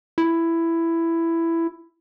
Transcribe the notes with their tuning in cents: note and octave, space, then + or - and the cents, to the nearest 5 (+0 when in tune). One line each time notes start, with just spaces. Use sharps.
E4 +10